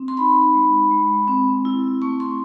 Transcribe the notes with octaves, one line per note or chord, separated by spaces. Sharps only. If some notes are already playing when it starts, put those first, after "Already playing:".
Already playing: C4
C6
D#4 B5
G#3
G#3
C4
E4
A3 C#6
C6